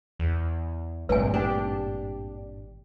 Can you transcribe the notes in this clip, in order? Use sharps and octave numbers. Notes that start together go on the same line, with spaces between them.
E2
G#1 D2 G2 A#2 C4 B4 G#5
D4 G4